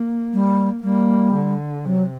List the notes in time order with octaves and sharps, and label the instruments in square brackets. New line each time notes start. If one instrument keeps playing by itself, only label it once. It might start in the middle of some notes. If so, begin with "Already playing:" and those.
Already playing: [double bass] A#3
[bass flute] G3
[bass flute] G3 [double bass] A#3
[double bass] D3
[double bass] C3 [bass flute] F#3